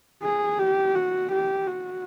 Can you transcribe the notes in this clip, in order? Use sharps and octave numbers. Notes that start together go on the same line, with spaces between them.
G#4
G4
F#4
G4
F#4